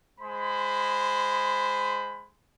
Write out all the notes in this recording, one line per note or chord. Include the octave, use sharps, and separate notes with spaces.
G#3 C5 B5